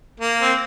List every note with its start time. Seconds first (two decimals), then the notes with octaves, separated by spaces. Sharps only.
0.20 A#3
0.42 C4